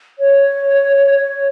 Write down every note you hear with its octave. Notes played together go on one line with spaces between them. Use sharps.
C#5